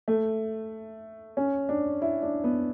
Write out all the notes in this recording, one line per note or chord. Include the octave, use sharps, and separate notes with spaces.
A3
C#4
D4
E4
D4
B3